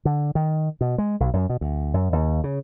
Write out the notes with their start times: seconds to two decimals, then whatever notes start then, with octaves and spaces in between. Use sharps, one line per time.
0.05 D3
0.35 D#3
0.81 B2
0.98 G#3
1.20 B1
1.33 F#2
1.49 B2
1.61 D2
1.94 F#2
2.13 D#2
2.44 C#3